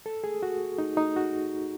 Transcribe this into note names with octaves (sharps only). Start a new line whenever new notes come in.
A4
G#4
F#4
D#4
D#4
F#4